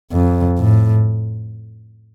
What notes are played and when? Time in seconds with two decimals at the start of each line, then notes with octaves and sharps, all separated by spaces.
0.13 F2
0.59 A2